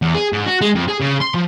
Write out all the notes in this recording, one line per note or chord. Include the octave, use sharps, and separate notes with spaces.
E2
G#4
G#2
F#4
G#3
F2
G#4
C#3
C6
F3